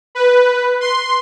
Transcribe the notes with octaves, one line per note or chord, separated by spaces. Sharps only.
B4
C6